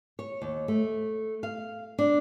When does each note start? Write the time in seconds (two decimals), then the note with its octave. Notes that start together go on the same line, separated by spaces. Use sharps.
0.19 C#5
0.42 D#2
0.68 A3
1.43 F5
1.98 D4